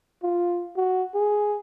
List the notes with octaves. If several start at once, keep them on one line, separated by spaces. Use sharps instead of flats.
F4
F#4
G#4